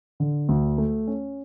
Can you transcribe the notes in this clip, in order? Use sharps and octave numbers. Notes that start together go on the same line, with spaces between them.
D3
D2
A3
C#4